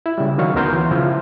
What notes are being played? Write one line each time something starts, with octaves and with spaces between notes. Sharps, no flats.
E4
C#3 G3
D#3 F#3 F5 C#6
D2 B3 F#4 A#4 C6 G6
E3
C#3 F3 E4 F4